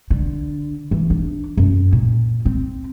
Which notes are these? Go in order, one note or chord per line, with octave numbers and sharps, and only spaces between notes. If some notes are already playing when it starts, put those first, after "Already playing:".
D3
E3
D4
F#2
A#2
C4